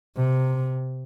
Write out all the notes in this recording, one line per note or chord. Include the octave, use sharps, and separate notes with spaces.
C3